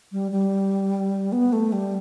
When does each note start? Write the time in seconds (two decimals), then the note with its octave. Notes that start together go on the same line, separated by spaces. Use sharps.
0.12 G3
0.32 G3
1.32 B3
1.53 A3
1.72 G3